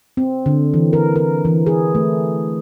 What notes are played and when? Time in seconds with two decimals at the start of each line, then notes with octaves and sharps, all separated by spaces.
0.17 C4
0.46 D3
0.74 E3
0.93 A#4
1.16 A#4
1.45 E3
1.67 G#4
1.95 A3